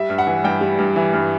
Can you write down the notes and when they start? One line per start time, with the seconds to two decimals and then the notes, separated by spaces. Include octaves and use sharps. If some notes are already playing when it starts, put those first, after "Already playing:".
Already playing: G3 E5
0.10 G2
0.18 F#5
0.27 E3
0.44 G2 G5
0.61 G3
0.79 G2
0.96 E3
1.13 G2